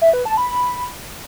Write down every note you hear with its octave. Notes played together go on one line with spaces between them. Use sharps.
E5
B4
A5
B5